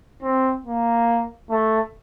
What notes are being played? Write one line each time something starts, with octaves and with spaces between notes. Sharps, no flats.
C4
A#3
A3